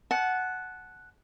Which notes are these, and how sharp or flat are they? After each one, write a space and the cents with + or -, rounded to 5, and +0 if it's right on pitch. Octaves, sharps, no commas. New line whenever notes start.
F#5 +0 A5 -30